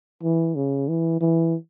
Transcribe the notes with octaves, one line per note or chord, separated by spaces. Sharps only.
E3
C#3
E3
E3